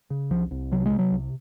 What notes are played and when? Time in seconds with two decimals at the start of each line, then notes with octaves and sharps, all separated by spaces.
0.10 C#3
0.30 C2 F3
0.51 C2
0.72 C3 F#3
0.86 G#3
0.91 C3
0.99 F#3
1.12 C2